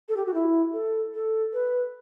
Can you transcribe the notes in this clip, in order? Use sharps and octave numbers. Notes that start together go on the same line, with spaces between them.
A4
G4
F#4
E4
A4
A4
B4